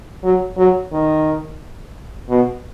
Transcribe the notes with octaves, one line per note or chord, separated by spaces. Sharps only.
F#3
F#3
D#3
B2